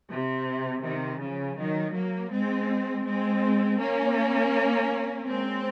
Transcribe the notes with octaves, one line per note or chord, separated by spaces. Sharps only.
C3
C3 D#3
C#3 F3
D#3 F#3
F#3 A#3
G#3 C4
G#3 C4
A#3 C#4
G#3 C4